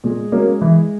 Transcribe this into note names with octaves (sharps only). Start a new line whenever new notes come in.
A#2 G#3
F#3 A#3 C#4
E3